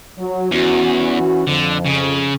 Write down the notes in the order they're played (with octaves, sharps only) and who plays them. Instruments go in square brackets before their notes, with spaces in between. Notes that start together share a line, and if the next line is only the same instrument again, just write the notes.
[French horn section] F#3
[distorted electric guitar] E2 [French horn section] E3 C#4 F#4
[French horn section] F2 F3 [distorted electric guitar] D3
[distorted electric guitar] C#3